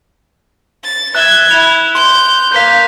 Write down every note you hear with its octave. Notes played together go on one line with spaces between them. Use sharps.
A6
E5 F#6 G#6 G7
E4 F7
C6 G6
A#3 F5 G6 B6